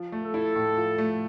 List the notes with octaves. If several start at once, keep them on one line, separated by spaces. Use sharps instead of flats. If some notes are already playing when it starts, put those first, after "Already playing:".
Already playing: F3
A3
A4
E4
A2
F3
A3